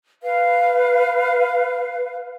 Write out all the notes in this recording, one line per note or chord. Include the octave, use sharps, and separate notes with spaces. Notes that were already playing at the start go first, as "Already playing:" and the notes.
B4 F5